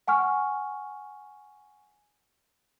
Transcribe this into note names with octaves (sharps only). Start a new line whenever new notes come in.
F#5 G#5 C#6 F6